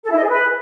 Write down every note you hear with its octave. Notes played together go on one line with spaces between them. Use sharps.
A4
E4
D#5
G#4
B4